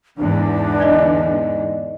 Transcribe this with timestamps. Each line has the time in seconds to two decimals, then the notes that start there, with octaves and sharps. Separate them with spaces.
0.18 E2 G#2 D3 D4
0.80 D#4 D5 D#5